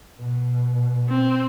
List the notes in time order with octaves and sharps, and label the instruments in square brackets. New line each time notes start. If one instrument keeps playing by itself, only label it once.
[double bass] B2
[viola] C4